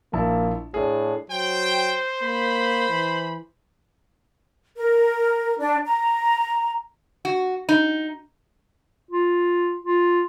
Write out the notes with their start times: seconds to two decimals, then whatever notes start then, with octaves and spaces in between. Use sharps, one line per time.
0.13 A#1 A#3 E4 A5
0.74 A2 D4 G#4
1.30 F#3 C5 G5
2.22 A#3 B5
2.89 E3
4.76 A#4
5.59 D4
5.86 A#5
7.25 F#4
7.69 D#4
9.11 F4
9.84 F4